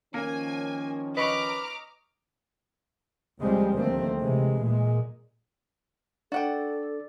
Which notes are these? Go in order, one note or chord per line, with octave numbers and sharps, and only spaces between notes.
D#3 F3 A#3 C#4 G#5
B4 D#5 A#5 C#6 D6 F6
C#2 C#3 F3 G3 G#3 C4
D2 D#3 A3 A#3 C4
C3 E3 G#3
A#2 G#3
D4 F#4 A4 D5 F#5 G5